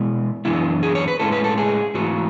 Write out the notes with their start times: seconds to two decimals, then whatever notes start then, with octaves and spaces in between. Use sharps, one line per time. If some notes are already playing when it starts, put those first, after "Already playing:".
Already playing: B2 G#3 B3 E4
0.45 F#2 E3 B3 D4 E4
0.83 G#4
0.95 C#5
1.08 B4
1.20 A2 G#3 C#4 E4 A4
1.32 B4
1.44 A4
1.58 G#4
1.94 G#2 E3 A3 E4 F#4